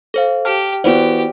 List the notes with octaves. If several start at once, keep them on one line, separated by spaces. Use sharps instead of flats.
A4 C5 F5
G4 G5 A5 F6
E3 B3 F#4 G4 C5 D5 F#5